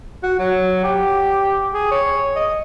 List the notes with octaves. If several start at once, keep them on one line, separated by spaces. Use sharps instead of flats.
F#4
F#3
G4
G#4
C#5
D#5